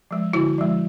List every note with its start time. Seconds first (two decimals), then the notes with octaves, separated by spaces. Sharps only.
0.11 F3 G#3
0.33 D3 E4 F#4
0.58 F3 G#3